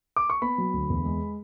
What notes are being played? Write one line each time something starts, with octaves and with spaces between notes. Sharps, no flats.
D6
C#6
B3 B5
F#3
D2
E2
G#3